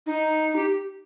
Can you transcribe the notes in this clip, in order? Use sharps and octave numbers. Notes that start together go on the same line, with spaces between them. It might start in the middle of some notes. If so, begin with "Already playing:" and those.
D#4
G4